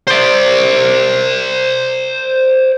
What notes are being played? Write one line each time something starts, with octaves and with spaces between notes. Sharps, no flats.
C5 D5